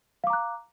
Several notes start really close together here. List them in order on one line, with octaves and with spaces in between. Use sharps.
F5 D6 A#5 F#6